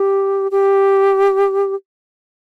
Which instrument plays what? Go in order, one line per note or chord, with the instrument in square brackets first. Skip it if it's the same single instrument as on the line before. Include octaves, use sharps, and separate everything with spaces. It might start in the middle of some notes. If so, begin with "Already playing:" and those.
Already playing: [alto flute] G4
G4